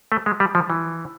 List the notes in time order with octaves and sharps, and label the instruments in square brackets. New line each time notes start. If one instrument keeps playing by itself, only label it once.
[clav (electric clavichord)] A3
G#3
G3
F3
E3